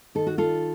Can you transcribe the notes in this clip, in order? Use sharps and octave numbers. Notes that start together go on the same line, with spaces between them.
D#3 A4
F#4
F4 A4